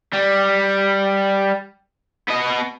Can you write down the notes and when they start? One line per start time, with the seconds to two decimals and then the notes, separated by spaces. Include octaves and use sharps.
0.13 G3
2.28 B3 D#5